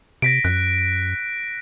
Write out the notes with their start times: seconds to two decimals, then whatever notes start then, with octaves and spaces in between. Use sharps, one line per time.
0.22 C3 A#6 B6 D7
0.45 F#2 F#6